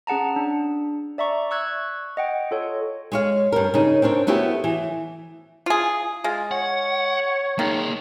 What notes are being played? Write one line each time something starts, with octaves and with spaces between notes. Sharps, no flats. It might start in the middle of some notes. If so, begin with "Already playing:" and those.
C#4 G#4 F#5 A5 A#5
D4
D5 E5 A#5 C#6
C#6 E6 F#6 G#6
D#5 F#5 G5
F4 A4 C#5
G#3 C#5 F5
G2 A#4
C#3 D#4
C4 D4 A#4 C#5
A3 B3 E4 F#4 G4
E3
F4 G#4
G#3 F4
C#5 F#5
D#3 A#3 G#4